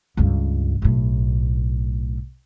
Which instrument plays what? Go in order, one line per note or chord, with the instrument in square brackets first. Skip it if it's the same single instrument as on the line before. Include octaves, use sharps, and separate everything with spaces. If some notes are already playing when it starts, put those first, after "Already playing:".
[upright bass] C#2 G2
B1 A2